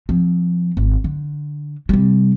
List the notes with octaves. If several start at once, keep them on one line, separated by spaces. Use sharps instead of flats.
F3 C4
G#1
D3
C3 G3